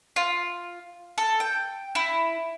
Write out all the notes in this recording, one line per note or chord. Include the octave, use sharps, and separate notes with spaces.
F4
A4
G5
E4